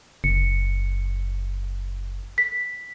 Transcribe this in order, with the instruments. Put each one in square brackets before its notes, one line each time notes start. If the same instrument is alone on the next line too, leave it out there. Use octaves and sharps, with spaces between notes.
[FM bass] F#1 [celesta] C#7
[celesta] B6